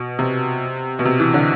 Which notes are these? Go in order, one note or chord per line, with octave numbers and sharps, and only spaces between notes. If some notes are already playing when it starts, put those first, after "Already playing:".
Already playing: B2
C3
B2
C3
E3
D3